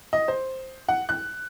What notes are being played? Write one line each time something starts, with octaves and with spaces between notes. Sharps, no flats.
D#5
C5
F#5
F#6